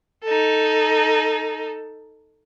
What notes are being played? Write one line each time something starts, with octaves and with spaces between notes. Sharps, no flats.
D#4 A4